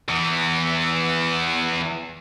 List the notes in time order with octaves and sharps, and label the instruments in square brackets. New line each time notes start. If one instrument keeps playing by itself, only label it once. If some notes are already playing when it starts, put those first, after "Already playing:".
[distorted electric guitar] E2 E3